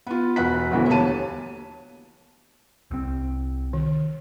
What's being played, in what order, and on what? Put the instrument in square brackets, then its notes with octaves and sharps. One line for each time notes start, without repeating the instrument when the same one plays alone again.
[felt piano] B3 F4
E1 F#4 F#6 B6
G1 D2 B2 D3 E3
D#2 C#5 A5 D#7
[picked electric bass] C2 C4
[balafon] D#3